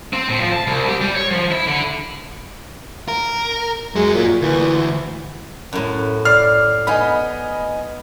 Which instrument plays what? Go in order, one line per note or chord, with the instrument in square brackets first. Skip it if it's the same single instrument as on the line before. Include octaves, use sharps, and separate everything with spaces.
[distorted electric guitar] C4
A2
F3
A5
C2
G4
G3
C#5
F3
E4
D3
[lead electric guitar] A#4
[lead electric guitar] F#2 F#3 [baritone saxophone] G#3
[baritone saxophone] A#2
[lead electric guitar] D2 [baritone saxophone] E3
[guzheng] F#2 A2
[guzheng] D5 [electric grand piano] F6 C7
[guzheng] B3 D#4 [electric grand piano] D#5 G#5 B5